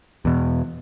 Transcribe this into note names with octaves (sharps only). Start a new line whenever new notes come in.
E2 B2